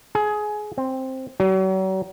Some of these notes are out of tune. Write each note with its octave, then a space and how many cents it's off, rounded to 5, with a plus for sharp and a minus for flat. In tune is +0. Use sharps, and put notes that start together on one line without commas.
G#4 +20
C4 +5
F#3 +40